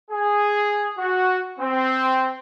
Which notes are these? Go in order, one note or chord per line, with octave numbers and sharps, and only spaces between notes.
G#4
F#4
C4